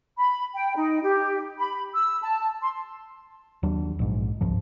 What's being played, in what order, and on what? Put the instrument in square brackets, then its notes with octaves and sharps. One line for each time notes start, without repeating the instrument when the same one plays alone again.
[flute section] B5
G5
D#4
G4
B5
E6
A5
C6
[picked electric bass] D#2 F#3 D4
A#1 G#2
G1 C#2 G#2 F3